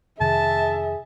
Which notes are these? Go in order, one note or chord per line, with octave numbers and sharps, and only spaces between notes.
F2 C3 D#3 G#4 E5 A5